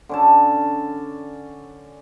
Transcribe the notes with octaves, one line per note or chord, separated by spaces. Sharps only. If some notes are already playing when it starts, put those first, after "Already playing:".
D3 C#4 A5